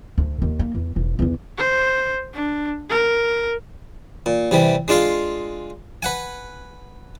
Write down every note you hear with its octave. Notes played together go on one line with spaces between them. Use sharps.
D2
D#2
A#3
E2
E1
E2 D3
C5
D4
A#4
A#2
C3 E3 G3
G#3 D4 F4 F5 C6
B4 F#5 G#5